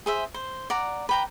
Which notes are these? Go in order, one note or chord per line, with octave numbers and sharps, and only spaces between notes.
G#4 C5 E5
C5
D5 F#5 A#5
B4 G5 A#5